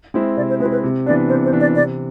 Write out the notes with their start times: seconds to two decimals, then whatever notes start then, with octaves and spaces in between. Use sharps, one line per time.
0.14 G#3 C4 E4
0.37 C3 D5
0.49 C5
0.60 G#3 C4 E4 B4
0.71 B4
0.83 C3
1.06 E3 B3 D4 D5
1.29 C3 C5
1.45 C5
1.53 E3 B3 D4
1.60 D5
1.75 C3 D5